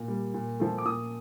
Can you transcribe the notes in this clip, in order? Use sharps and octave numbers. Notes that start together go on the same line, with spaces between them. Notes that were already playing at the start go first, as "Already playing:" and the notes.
Already playing: A#2
G3 A#3
A#2
F3 A3
D6
A#2 D#6